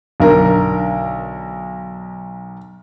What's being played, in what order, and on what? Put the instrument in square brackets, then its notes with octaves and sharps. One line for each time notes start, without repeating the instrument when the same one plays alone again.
[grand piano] B1 D3 A#4